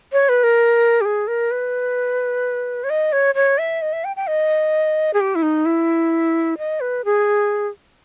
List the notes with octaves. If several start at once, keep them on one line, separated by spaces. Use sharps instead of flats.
C#5
B4
A#4
G4
G#4
A#4
B4
C#5
D#5
C#5
C#5
E5
D#5
E5
G5
G5
D#5
G#4
G4
E4
D#4
E4
D#5
B4
G#4